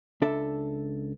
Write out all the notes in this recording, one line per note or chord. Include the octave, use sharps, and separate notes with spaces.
C#2 D4 A4 E5